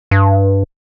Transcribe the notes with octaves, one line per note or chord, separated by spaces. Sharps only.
G2